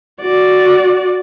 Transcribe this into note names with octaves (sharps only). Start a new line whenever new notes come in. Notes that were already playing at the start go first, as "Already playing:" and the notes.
F#4 D5